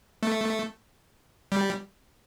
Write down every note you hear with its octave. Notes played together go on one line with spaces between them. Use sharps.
A3
G3